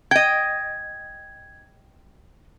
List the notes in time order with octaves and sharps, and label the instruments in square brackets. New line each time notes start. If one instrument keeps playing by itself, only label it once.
[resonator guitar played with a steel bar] D#5 G5 [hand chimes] G#6